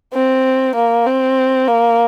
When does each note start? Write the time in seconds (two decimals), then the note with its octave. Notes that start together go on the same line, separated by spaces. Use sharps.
0.14 C4
0.75 A#3
1.07 C4
1.68 A#3